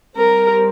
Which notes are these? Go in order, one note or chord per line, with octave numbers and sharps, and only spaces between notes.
G3 C4 A#4